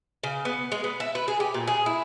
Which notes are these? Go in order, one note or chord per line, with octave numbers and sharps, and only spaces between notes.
C#3
B3
G#3
B3
E5
B4
G#4
G4
A#2
G#4
E4